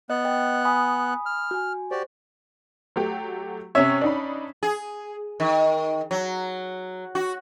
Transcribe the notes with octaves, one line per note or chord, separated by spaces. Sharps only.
B3 D#5 F#6
D#5 G5
G#5 B5 D#6
F6
F#4 G#5
F#4 G4 C5 D5
F#3 A3 G4
C3 C#4 C#5 E5
D4 D#4 B5
G#4
D#3
F#3
F#4